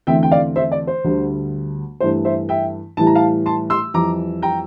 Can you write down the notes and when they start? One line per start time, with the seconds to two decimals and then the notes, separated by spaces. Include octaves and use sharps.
0.07 E2 D3 A3 C4 E5 G5
0.23 G5
0.31 D5 F5
0.56 C5 E5
0.72 D5
0.87 C5
1.04 D2 D3 G3
2.00 G2 E3 A3 C5
2.25 C5 E5
2.49 E5 G5
2.97 A2 E3 G3 A5
3.07 A#5
3.15 F5 A5
3.46 A5 C6
3.70 C6 E6
3.94 F2 E3 G3 A#5 D6
4.42 G5 A#5